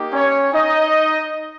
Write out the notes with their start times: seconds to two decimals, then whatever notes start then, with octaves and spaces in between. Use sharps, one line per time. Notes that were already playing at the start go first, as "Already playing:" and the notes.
Already playing: A#3 D#4 G4
0.13 C#4 C#5
0.54 D#4 D#5